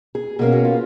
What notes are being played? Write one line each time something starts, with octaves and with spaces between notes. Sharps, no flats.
G#4
B2 A#3 C#4 G#4
F#4
F4